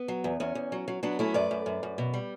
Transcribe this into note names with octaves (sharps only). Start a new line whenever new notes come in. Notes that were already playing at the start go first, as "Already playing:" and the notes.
Already playing: B3
F#3
E2
E2 C#4
E2
F#3
F#3
F#3 B3 D4
A3 C#4 E4
F#2 B4 D5
F#2
F#2
F#2
B2
G3